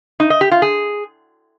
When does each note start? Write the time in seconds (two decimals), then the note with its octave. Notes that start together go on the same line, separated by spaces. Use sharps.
0.20 D#4
0.30 D#5
0.41 G4
0.51 F4
0.62 G#4